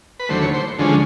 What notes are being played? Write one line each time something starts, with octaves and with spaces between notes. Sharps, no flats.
B4
D#2 D3 F#3 A3 C5
C#5
C5
D2 D3 F3 G#3 C#4